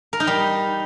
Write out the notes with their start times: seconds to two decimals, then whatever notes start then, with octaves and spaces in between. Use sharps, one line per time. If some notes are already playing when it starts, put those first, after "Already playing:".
0.13 A#4
0.20 D#4
0.27 G3